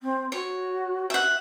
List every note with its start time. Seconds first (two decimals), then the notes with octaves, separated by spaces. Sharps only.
0.01 C4
0.32 F#4 C#5
1.10 E5 F#5